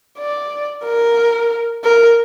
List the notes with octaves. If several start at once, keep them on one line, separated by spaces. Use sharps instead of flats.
D5
A#4
A#4